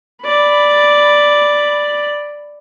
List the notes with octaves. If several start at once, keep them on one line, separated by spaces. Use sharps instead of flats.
D5 B5